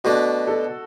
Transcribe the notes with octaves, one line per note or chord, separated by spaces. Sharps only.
B2 A3 D4 F#4
A4